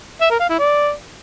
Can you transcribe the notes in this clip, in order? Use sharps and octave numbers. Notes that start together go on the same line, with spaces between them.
E5
A#4
F5
E4
D5